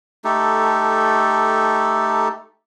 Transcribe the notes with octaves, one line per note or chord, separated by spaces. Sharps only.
A3 D#4 G4 A4